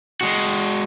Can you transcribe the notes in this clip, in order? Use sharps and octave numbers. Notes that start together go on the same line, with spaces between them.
G#3 F#4